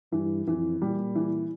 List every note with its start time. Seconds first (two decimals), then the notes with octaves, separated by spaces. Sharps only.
0.12 G2 E3
0.47 F2 E3
0.81 A#2 G3
1.15 E3